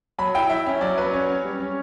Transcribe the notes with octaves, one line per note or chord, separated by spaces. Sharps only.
F#3 B5
E4 G5
E4 E5
C#4
F#3 D5
F#3 B4
C#4 C#5
C#4
G3
C#4